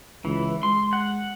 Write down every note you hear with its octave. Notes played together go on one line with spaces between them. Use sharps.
C#2 E3
G#3 C6
F#5